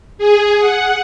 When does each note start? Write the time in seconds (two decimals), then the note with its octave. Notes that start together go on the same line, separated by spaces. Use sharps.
0.18 G#4
0.59 F#5